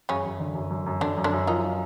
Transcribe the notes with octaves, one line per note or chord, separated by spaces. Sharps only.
F#2 C#3 C#4
F#2
D3
F#2
F#2
F#2
F#2 D3 D4
F#2
D3 D4
F#2
D#3 F3 D#4
F3